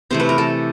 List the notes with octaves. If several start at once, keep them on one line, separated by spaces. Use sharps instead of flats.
C3 E3 A3 C5
B4
A#4
A4